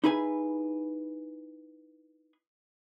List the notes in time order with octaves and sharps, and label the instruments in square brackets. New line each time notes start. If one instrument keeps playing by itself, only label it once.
[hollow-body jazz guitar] D#4 E4 G#4 B4 G#5